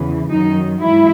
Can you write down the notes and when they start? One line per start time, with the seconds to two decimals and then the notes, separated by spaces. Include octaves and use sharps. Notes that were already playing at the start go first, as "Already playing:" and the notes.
Already playing: E2 C#3 E3
0.30 F#2 D#3 F#3 D#4
0.82 G#2 E3 E4